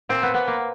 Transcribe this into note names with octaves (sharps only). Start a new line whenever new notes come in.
A#2 C4
B3
A#2 B3
A#3